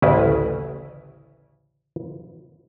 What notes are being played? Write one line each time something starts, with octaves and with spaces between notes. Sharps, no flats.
A1 D2 C#3 E4 B4